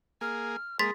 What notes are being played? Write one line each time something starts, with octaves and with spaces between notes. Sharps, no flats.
A#3 G#4 F6
G#3 A#3 G#4 C6 A6 B6